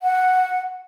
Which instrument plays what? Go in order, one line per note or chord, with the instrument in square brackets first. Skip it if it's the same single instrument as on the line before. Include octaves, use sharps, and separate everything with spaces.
[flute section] F#5